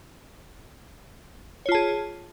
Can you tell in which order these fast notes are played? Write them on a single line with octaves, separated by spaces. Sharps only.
C#5 F4 A5 G#4